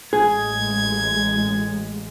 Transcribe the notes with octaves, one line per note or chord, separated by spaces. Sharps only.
A1 G#3 G#4 G#6